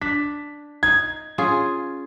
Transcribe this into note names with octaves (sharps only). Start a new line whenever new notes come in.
D4 B6
D#4 G#6
C#4 F4 G#4